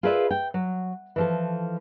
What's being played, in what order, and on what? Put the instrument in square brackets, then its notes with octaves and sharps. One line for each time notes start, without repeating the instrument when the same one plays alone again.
[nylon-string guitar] F4 G#4 A#4 B4 D5 E5
G5
F#3
E3 F3 A4